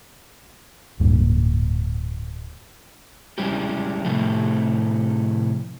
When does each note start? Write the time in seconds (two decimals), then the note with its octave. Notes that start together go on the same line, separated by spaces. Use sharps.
1.00 D1 G2 A#2
3.38 G3 G#3 C#4 E4 G4
4.05 A2 C3 F3 A3